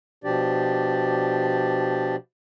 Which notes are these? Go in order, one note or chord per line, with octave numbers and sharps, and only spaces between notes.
B2 F3 D4 G4 D5